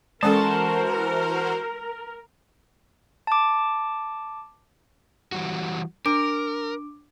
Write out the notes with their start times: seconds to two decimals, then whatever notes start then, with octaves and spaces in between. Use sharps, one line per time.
0.23 E3 G#3 C#4 F#4 A4 A#4 C5 A5
3.27 A5 D6
5.32 E3 G3 F#4
6.06 D4 A#4 D6 D7